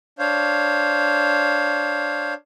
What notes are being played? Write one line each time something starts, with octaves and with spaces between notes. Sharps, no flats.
D4 C5 C#5 F5